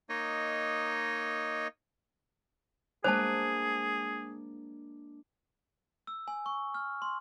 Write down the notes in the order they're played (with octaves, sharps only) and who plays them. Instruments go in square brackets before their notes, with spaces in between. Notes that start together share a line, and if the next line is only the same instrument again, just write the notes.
[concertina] A#3 D#4 C#5 D#5
[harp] G#3 A#3 D4 [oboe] G#4 [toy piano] C5 A5
[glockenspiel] E6
G#5
C#6
F6
C6